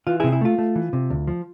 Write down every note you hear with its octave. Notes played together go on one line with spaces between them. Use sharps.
E3 F4
C3 E4 G#4
E4
A3 F4
A3
E3
C3
D2
F3